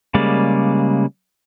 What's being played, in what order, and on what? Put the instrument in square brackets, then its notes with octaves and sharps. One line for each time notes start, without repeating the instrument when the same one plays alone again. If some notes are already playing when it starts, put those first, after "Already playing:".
[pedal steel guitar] C#3 G3 G#3 A#3 D5